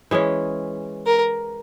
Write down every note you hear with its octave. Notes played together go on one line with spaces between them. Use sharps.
E3 G#3 C#4
A#4